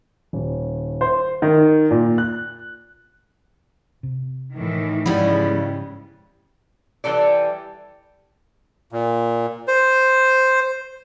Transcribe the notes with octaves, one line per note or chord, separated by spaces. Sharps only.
D#1
C5
D#3
A#2
F#6
C3
A2 D#3 E3
G#2 C#3 F3 G3 B3 E4
E3 G3 A4 D5
A#2
C5